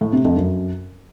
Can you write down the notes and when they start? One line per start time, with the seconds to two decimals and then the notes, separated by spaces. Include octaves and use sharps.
0.01 A2
0.13 C3
0.25 F2
0.36 F#2